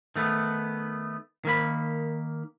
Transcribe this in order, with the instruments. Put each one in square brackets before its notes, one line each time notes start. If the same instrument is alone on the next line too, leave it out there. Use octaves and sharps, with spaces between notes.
[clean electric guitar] D#3 A3 B3
D#3 A#3 B5